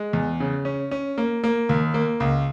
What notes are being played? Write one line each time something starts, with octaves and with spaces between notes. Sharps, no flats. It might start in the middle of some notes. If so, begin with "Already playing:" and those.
Already playing: G#3
E2
C#3
C#4
C#4
A#3
A#3
D#2
A#3
C#2